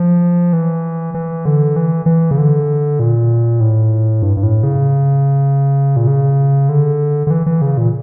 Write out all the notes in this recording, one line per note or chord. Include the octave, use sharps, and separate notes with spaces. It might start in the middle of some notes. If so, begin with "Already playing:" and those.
Already playing: F3
E3
E3
D3
E3
E3
C#3
D3
A#2
A2
G2
G2
A2
C#3
A#2
C#3
D3
D3
E3
E3
C#3
A#2